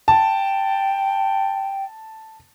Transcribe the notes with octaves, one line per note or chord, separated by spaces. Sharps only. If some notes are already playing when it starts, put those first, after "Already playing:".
G5 A5